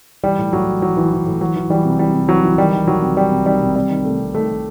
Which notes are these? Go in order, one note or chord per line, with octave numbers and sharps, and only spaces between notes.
E3 G3
A2
A2 F#3
E3
E3 F#3
E3
E3
A2
E3 F#3
E3
E3 G3
C3
E3 G3
C3
E3 F#3
E3
D#3 G3
D#3
D#3 F#3
C3
C3 G3
C3
D#3 G3
C3
C3 G3
D#3
C3 A3
C3
D#3 A3
D#3